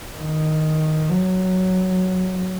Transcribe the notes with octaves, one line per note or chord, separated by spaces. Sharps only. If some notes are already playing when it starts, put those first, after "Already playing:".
D#3
F#3